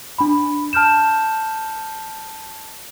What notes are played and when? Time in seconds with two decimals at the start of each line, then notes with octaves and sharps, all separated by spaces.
0.18 D4 B5
0.73 A5 F6 G6 E7